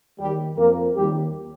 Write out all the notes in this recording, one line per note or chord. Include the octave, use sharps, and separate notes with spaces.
D#2 D#3 G3 G4
F2 F3 A#3 A#4
D#2 D#3 G3 G4